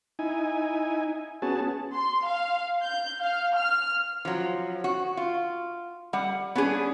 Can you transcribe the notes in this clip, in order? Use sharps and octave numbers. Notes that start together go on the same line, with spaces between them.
D#4 E4 G#5
B3 C#4 F#4 G#4 A5
C6
F5
G6
F5
F6
F3 F#3
F#4
F4
G3 F#5
B3 C#4 D4 G#4